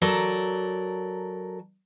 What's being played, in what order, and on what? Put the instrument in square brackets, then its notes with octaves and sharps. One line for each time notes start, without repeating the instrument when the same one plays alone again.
[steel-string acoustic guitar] F#3 A4 A#4 D5